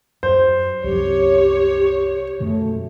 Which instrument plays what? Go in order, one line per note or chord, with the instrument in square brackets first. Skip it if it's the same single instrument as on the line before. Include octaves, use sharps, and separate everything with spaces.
[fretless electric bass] F#2 [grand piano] C5
[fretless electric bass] C2 F#2 F#3 [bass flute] G4 [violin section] C#5
[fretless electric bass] F#2 B2 D#3 [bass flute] A3